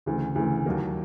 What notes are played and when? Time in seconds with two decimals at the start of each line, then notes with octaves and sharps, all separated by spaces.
0.06 D2 C#3 E3
0.36 D2 C#3 E3
0.66 D#2 D#3 F#3 A#3